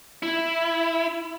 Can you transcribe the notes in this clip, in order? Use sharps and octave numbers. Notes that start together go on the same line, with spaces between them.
E4